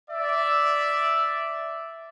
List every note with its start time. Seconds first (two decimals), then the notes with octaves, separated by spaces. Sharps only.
0.11 D5 E5